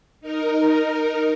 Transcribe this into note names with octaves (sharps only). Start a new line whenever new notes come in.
D#4 A#4